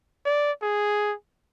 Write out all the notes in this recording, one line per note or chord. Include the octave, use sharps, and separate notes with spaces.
D5
G#4